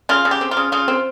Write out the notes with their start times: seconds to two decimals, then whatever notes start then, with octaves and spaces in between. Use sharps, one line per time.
0.09 C#3 F4
0.25 C#3
0.31 G4
0.41 C4
0.51 F4
0.57 C#3
0.72 C#3 F4
0.88 C4